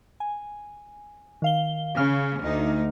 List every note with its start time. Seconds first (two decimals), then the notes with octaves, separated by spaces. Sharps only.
0.20 G#5
1.42 D#3 F5 G7
1.97 C#3 F6
2.42 D2 D#4